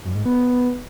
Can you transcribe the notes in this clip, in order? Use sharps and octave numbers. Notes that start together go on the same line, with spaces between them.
F#2
G#2
B3